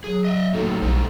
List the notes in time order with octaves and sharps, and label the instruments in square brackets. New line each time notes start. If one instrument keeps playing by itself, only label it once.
[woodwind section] F#3 [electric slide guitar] G#4
[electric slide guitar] D#5 E5
[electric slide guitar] A2 F#3 A#3 [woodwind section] D#4 F4 A4
[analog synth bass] B1 [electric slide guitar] A2 G3 C5